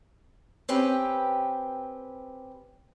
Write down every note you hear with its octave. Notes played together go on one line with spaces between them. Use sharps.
C4 C#4 G4 B4 G5